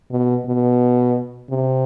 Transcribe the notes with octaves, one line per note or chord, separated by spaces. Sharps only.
B2
B2
C3